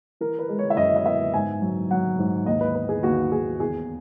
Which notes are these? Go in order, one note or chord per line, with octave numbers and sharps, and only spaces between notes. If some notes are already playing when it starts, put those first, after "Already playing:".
E3 A#4
B4
G#3
C#5
E5
F#2 D#5
D#5
B3 E5
G#2 G#5
F#3
F#3 F#5
G#2
D#2 D#5
B4
B3 B4
G#4
D#2 F#4
D#2 G#4
E2 G#4